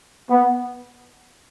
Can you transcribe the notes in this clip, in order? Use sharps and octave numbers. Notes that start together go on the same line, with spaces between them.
B3